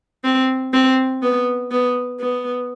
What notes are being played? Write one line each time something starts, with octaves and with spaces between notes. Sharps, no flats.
C4
C4
B3
B3
B3